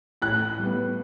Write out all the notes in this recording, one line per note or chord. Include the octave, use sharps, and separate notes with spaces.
A2 F#6
G3 B3